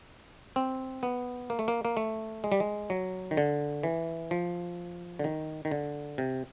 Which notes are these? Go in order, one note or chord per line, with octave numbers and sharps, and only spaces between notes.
C4
B3
A#3
A3
A#3
A#3
A3
G#3
G3
G#3
F#3
D#3
D3
E3
F3
D3
D#3
D#3
D3
C3